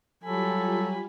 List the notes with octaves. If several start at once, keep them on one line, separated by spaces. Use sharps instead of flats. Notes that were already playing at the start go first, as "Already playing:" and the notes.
F#3 G3 F4 G4 A4 G#5 B5